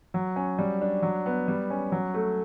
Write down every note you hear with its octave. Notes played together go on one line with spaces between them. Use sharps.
F#3
C#4
G3
D4
F#3
B3
G3
C#4
F#3
A3